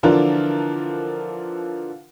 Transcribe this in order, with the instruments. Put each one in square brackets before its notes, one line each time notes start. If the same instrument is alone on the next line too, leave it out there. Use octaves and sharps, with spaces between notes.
[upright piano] D3 E3 F3 D4 F4 A#4